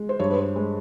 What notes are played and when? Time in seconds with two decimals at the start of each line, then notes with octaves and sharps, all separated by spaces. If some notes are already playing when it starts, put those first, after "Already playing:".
Already playing: G#3
0.09 C5
0.20 G2 C#5
0.30 B4
0.38 C5
0.56 G#3